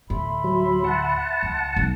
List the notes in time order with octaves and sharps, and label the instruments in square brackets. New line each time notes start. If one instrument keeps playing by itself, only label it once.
[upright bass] D2 A2 [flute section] E5 B5 C6
[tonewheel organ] F#3
F#5 A5
[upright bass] C#2
B1